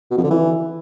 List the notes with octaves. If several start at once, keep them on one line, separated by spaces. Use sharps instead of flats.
B2
F2
D3
E3